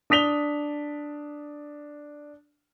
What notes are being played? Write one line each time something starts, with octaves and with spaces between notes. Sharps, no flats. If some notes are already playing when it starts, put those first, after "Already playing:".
D4 D#6 B6 F7 G7